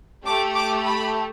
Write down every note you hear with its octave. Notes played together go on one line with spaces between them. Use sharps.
A3 G4 D6
D6
B5